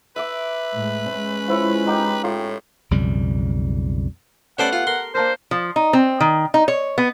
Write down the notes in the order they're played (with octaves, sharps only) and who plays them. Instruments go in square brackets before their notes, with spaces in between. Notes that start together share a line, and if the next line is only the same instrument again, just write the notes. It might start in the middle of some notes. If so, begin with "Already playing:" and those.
[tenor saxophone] B4 [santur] E5 D6
[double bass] A2 G#3
G#3 C#4
[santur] F3 E4 C#5
D#4 G4 G5
[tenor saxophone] A2 [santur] F4
[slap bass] B1 F2 C#3 G3
[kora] A3 B3 G4 [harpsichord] C#4 C5 D5 [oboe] F#5
[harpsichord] F4
[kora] A#4 [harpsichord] C6
[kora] A#3 D4 A#4 [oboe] C5
[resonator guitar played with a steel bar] F3
D#4
C4
D#3
D#4
C#5
B3